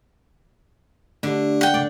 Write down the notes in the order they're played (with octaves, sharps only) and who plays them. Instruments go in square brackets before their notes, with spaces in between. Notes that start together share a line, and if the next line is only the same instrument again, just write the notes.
[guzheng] D3 [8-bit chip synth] A3 D4 G4
[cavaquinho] F#5 G5
[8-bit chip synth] C#3 A3 [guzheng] D5